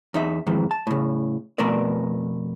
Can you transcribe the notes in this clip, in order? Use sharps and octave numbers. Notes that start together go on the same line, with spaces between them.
E2 D#4 E5
F2 G#2 D#3 E3
A5
A2 C#3
F2 B2 A3 B3 A#4 D5